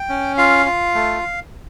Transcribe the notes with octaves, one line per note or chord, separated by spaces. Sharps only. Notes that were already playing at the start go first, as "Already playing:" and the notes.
Already playing: G5
C#4
F4 F5
F4
A3